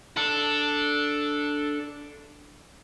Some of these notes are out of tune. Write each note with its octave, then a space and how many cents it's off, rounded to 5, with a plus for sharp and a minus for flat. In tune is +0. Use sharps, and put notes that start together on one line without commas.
D4 +0 A4 +0